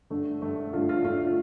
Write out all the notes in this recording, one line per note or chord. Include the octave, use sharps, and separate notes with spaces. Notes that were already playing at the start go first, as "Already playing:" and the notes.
G2 D3 A3
G2 D3 A3
G2 D3 A3 F4
F4
G2 D3 A3 F4
F4